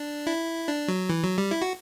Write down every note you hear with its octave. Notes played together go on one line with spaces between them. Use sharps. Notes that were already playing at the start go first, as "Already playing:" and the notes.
Already playing: D4
E4
D4
F#3
E3
F#3
G3
E4
F#4